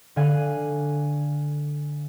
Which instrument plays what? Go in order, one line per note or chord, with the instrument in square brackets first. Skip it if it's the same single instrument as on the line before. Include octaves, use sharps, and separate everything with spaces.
[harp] D3 F5 G#5 F#6 D#7